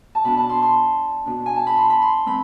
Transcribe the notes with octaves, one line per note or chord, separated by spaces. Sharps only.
A5
B2 B3 D4 B5
A5
C6
C6
B2 B3 D4
G#5
A5
B5
C6
B5
C6
E3 A3 C4 B5